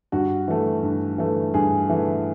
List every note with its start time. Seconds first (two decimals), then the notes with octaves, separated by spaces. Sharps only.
0.12 G2 F#4
0.48 E3 A3
0.83 G2
1.18 E3 A3
1.54 G2 G#4
1.89 E3 A3